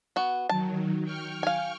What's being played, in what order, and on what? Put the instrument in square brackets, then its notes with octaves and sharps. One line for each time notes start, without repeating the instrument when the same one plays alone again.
[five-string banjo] B3 F#4
[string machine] D#3 F#3 [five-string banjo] A5
[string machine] G5 C#6 F6
[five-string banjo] F5 G#5